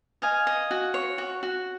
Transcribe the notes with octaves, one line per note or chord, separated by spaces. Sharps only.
D#5 F5 G#5
D#5
F#4
C#5
F#4
F#4